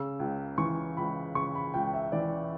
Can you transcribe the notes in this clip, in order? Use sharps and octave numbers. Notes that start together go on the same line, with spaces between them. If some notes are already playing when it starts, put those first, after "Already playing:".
Already playing: C#3 E6
C#2
E3 C#6
C#2 B5
C#3 C#6
B5
C#2 G5
E5
E3 D5